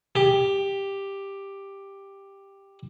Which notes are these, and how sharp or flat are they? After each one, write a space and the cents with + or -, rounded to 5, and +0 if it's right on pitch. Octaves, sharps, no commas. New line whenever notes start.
G4 +5